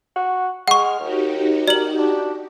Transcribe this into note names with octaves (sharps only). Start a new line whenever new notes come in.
F#4
G#3 F#5 C#6 F6
D#2 D#4 F#4 G4
A#4 D5 F#7
D4